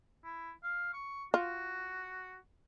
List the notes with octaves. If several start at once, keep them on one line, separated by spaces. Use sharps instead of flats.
E4
F5
C#6
F4 F#4